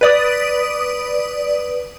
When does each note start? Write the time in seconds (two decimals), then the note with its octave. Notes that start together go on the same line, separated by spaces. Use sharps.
0.01 B4 D5 D#6